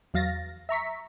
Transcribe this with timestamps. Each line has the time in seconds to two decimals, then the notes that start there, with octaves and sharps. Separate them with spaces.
0.14 E2 F#3 F5 A6 A#6
0.69 E5 A#5 C#6 B6